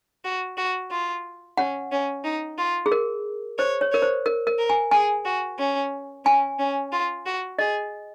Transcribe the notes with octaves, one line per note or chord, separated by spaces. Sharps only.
F#4
F#4
F4
C#4 F#5
C#4
D#4
F4
G#4
A#4
C5 C#5
C#5
A#4 C#5
C5
A#4
A#4
A#4
G#5
G#4 G#5
F#4
C#4
C#4 G#5
C#4
F4
F#4
G#4 D#5